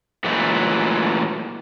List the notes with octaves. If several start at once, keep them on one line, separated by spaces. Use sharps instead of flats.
A#2 E3 F#3 G#3 A3